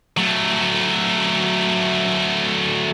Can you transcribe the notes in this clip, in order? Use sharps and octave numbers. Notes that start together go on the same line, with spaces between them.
F#3 A3